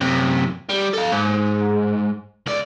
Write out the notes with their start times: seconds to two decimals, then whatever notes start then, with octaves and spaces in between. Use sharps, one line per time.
0.01 F#2 C3
0.69 G3
0.93 A4 F5
1.12 G#2
2.46 C#2 D5